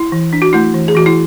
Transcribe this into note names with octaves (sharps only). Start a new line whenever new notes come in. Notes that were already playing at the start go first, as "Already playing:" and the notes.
Already playing: E4
E3
D4
F#4
A3 E4
E3
G#4
E3 F#4
E4